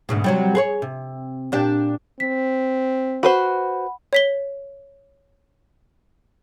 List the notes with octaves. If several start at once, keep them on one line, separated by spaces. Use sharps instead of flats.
D2 G#2 B2
C3 F#3 G3
G#4 B4 C#5
C3
A#2 D4 G4
C4 B6
F#4 B4 C5 F#5 B5
C#5 B6 G7